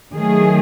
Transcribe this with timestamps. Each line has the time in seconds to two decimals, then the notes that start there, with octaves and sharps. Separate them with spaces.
0.15 D#3 F#3 A3 G#4